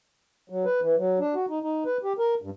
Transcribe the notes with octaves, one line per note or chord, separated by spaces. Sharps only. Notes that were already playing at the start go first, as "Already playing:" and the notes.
F#3
B4
E3
F#3
D4
F#4
D#4
D#4
B4
G4
A#4
G2